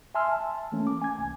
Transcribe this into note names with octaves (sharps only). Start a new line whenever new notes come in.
E5 G#5 A5 C6 E6 F6
A5
E3 A3 A#3 C#4
D6
G#5 G#6
C2